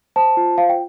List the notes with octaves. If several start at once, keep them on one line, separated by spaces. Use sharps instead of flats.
C5 A5
F4
C5 F5
G5